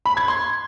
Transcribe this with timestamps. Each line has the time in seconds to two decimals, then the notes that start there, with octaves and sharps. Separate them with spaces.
0.06 B5
0.17 G#6
0.28 C6